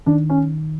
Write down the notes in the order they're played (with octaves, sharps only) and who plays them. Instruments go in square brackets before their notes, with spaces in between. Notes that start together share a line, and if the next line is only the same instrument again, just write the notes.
[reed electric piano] D#3 [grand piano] D4
[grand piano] C#4